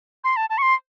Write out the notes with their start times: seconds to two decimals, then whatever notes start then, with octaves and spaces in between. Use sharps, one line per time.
0.24 C6
0.36 A5
0.50 A5
0.58 C#6
0.62 C6